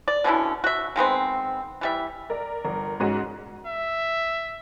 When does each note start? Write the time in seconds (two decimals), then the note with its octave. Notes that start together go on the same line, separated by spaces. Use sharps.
0.08 D5
0.24 B2 D3 C#4 E4
0.64 F#4 E5
0.96 D#3 G#3 B3 C4
1.81 E3 G3 E5
2.30 A#4 D5
2.64 G1 A#4
3.00 G#2 G#3 C#4 F#4 G#4 D#7
3.67 E5